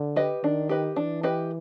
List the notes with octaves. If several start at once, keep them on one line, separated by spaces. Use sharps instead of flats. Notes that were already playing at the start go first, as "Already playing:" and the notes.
Already playing: D3
G4 B4 D#5
D#3 D4
G4 B4 D#5
E3 D4
G4 B4 D#5